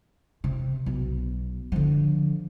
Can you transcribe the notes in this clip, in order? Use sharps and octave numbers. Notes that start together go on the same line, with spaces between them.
C3
B1
D3 F3